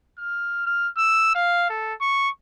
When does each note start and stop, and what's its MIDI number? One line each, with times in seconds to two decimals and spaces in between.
0.19 0.64 89
0.66 0.88 89
0.97 1.32 88
1.35 1.68 77
1.69 1.94 69
2.01 2.30 85